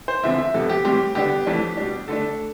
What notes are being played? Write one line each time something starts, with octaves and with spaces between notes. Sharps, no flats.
C5
E2 D3 F3 C4 E5
E5
F2 C3 F3 B3 A4
G4
A2 E3 G3 C4 G4
D3 G3 B3 D4 G4
F2 E3 A3 D4
B2 G3 D4
D3 A3 D4 A4